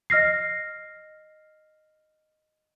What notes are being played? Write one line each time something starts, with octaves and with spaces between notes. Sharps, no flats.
D#5 F6 A#6 C7